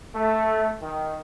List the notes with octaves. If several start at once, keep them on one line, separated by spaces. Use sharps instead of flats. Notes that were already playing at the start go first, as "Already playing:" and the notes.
A3
D#3